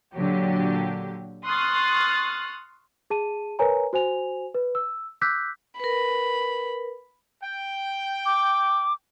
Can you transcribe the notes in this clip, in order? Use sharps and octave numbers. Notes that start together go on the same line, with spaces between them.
A#2 D3 F#3 G4
C6 C#6 D#6 F6 F#6 A6
G#4 A5 D#7
A#4 B4 C#5 G#5 A#5
F#4 C5 G#5 F7
B4
E6
D6 E6 F#6 G6 B6
A#4 B4 B5
G5
D6